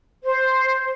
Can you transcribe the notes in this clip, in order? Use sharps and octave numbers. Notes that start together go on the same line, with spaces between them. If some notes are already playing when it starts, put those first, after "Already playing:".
C5